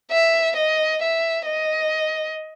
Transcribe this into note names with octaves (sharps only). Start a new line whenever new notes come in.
E5
D#5
E5
D#5